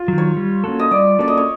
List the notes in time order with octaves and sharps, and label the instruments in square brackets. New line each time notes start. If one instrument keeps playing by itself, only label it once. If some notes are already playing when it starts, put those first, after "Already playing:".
Already playing: [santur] F4
[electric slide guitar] D#3 F#3
[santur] C#5
[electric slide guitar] G3
A#3 C#4 F#4 A4
[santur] D#5
[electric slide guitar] G3 [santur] D5
[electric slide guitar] A#3 C#4 F#4 A4 [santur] D5
[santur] D#5
C#5